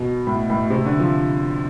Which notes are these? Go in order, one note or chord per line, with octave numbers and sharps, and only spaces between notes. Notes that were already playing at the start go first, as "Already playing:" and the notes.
Already playing: B2
A2
A2
C3
D3
F3